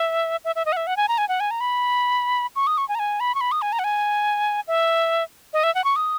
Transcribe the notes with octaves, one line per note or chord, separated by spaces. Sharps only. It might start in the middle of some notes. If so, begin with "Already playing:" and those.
Already playing: E5
E5
E5
D#5
F#5
E5
F#5
G#5
A#5
G#5
F#5
G#5
A#5
B5
C#6
D#6
C#6
G#5
A#5
G#5
B5
C#6
B5
D#6
G#5
A#5
F#5
G#5
E5
D#5
E5
F#5
C#6
D#6